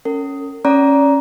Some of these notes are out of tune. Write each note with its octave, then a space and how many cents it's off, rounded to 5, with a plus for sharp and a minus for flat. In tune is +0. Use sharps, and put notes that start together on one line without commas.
C#4 +0 A#4 -45
C#4 -10 D5 -25 A#5 +10